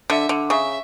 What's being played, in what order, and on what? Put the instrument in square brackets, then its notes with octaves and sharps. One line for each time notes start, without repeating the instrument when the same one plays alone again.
[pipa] D3 [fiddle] E5
[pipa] D3
[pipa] C#3 [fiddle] E5